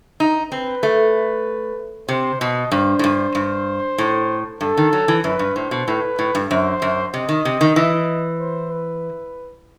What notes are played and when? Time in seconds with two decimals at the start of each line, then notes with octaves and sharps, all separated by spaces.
0.20 D#4
0.51 C4 B4
0.83 A3
2.09 C3 C5
2.41 B2 D#5
2.72 G2 C5
2.99 A2
3.04 G2
3.35 G2
3.98 A2
4.61 G2 A4
4.77 D#3
4.93 F#3
5.08 E3
5.24 F#2 B4
5.39 G2
5.56 A2 C5
5.71 B2
5.88 A2 B4
6.19 A2
6.35 G2
6.51 F#2 C5
6.82 F#2
7.14 C3 D#5
7.29 D#3
7.45 C3
7.61 D#3
7.76 E3
8.40 C5
8.71 B4